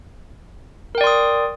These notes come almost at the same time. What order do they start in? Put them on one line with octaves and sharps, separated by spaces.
A#4 G5 D5 C6 D#6